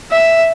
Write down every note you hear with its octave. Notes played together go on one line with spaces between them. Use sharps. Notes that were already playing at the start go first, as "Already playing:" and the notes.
E5